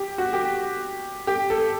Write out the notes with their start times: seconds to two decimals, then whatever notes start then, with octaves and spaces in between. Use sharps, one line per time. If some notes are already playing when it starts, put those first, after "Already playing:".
Already playing: G4
0.18 F#4
0.33 G4
1.27 G4
1.50 A4